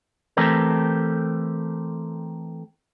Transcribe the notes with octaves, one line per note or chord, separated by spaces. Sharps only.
E3 A3 C4 G4 A4 A#4